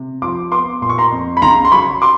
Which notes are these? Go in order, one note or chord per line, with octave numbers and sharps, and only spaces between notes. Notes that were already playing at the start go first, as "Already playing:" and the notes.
Already playing: C3
F3 C6 D6
B3 C6 D6
A#2 C6
C#6
A#5 C6
F2
B5
C#3 A#5 C6
C6
F#3 B5 C#6
C6 D6